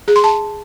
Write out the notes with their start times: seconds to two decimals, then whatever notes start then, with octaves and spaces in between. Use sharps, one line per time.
0.08 G#4
0.16 C6
0.24 A5